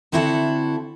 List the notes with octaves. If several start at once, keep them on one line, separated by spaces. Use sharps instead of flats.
D3 C4 E4 F#4 G4 A4